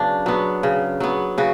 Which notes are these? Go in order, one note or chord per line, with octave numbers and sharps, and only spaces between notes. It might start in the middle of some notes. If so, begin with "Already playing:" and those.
Already playing: C#3 F#3 B3 D4
F#3 B3
C#3
F#3 B3
C#3 F#4